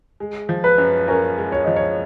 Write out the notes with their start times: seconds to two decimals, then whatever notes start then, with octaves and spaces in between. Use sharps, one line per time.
0.20 G#3
0.49 F3
0.64 B4
0.78 F#2
1.08 C#4 A#4
1.38 G#3
1.52 C#5
1.64 F3 D#5
1.76 C#5